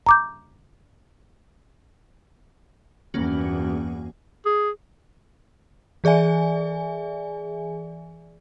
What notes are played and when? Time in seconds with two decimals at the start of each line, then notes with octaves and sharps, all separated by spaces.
0.07 A#5 D6 G6
3.14 E2 G2 A#3 C#4 F#4
4.46 G#4
6.04 E3 G#4 D5 E5 G#5